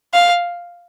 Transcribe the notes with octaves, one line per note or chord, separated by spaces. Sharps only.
F5